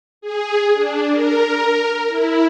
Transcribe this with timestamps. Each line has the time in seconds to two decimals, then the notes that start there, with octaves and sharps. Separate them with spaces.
0.21 G#4
0.74 D4
1.11 A#4
2.08 E4